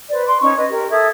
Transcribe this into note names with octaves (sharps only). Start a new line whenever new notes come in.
B4 C5 D5
C6 D6
C#4 D#4 C#6 D6
B4 D#5
G4 A#4
A4 E5 D#6 G#6